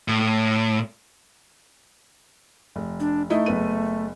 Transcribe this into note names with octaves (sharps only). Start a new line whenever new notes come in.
A2
F1
D4
A3 D#4 E4 D#5
F#1 B3 D#7